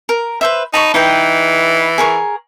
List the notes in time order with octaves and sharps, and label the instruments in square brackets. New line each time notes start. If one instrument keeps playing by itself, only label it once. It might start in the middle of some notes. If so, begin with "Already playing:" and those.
[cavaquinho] A#4
B4 C5 E5
[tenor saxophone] D#4 [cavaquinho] A5 B5 C#6
[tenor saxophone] E3 [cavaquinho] D#4 B4 G5
[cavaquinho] G#4 A#4 C#6